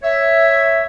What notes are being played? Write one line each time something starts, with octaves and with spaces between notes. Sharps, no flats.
C#5 E5